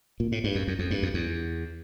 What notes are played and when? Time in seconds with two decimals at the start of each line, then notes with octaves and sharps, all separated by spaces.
0.20 A#2
0.32 A2
0.44 G2
0.55 F#2
0.68 F#2
0.79 F2
0.91 G2
1.03 F2
1.14 E2